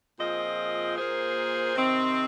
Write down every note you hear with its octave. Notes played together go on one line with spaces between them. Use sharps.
A#2 F3 C4 G#4 D#5
A#2 A#3 G#4 C5
C3 D#3 C4